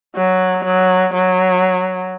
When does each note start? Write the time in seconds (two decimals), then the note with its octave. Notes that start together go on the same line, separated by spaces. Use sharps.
0.15 F#3
0.65 F#3
1.14 F#3